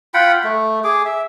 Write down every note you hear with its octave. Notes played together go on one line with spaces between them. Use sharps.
F4 F#5 G5 B5
A3
G#4 D6
E5